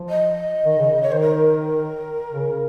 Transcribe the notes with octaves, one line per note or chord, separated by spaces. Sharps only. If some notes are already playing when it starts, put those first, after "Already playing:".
Already playing: F3
D#5
D#3
C#3
C#5
D#3 C5
A#4
C#3